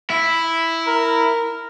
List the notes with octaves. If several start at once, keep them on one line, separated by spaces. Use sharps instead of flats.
E4
A#4